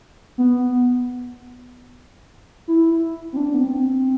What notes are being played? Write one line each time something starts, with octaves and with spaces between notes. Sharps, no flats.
B3
E4
E4
C4
D4
B3
C4